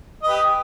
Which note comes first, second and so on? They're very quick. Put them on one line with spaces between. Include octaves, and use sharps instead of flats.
D#5 B4 G4